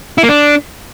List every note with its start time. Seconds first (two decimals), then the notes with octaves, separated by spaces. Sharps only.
0.18 E4
0.23 A#3
0.29 D4